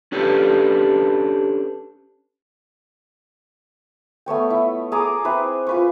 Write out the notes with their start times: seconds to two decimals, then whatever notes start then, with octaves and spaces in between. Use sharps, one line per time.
0.12 C#4 D4 G4 A4 B4
4.26 A3 B3 C#5 G5
4.50 E4
4.92 G#4 A#5 D6 D#6
5.25 C4 E4 B4 C5
5.67 F4 B4 C#6